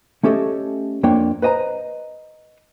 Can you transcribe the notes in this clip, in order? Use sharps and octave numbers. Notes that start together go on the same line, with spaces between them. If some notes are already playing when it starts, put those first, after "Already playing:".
A3 C#4 G4 A4 C#5 D#5
F2 A#3 D4 C#5 G5
B4 C5 D#5 G#5 A#5